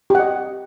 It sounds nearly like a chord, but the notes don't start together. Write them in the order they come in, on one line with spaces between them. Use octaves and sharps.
G4 F#5 D#5